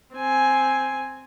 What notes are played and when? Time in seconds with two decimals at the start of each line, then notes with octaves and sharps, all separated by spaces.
0.15 C4 G#5